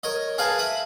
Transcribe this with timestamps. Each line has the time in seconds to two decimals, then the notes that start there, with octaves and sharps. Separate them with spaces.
0.03 A#4 C#5 D#5
0.38 G#4 A#4 B4 F5 G#5 A5
0.58 E5 B5 D#6